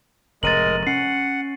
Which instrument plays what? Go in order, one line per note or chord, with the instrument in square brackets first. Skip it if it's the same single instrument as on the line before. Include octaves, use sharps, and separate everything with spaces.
[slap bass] F1 A2 [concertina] G#3 A#4 [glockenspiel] A6 D#7 F#7
[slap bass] C#4 [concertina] F#5 [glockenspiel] C7